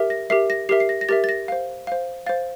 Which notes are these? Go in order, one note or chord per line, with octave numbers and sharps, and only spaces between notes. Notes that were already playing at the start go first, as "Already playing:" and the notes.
Already playing: G4 A#4 E5
A#6
G4 A#4 E5 C7
A#6
G4 A#4 E5 C7
C7
A#6
A#6
G4 A#4 E5 A6
A6
A#6
C5 F5
C5 F5
C5 F5 A6